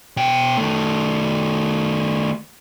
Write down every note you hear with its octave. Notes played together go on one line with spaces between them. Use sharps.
B2 G5
D#3 A3